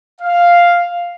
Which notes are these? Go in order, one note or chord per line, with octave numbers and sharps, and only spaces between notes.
F5